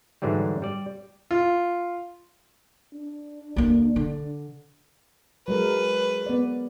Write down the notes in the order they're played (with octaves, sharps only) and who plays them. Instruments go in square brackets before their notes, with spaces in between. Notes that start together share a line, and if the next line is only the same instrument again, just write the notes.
[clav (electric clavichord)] G#2 D3 E3 F#3 G3
G3 D5
[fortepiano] F4
[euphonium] D4
[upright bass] D2 A#3
D3
[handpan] F#3 G#3 A#4 [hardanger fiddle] B4
[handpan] B3 D5